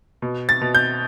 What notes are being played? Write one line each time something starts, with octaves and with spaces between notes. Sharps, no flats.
B2
A6
B2
G6